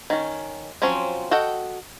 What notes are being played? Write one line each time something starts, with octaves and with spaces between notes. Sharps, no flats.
D#3 C#4
F3 F#3 C4 C#4
F#4 A4 D#5 F#5 G5